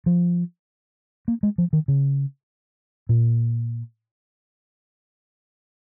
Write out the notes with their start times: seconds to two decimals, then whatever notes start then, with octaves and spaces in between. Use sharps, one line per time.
0.06 F3
1.28 A#3
1.43 G#3
1.58 F3
1.73 D#3
1.88 C#3
3.09 A#2